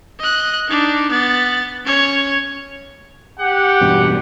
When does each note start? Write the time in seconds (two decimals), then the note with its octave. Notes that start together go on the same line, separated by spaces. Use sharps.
0.19 D#5 F#6
0.68 D4 D#4
1.10 B3 A6
1.85 C#4 C#5
3.39 G4 F#5
3.81 E2 G2 B2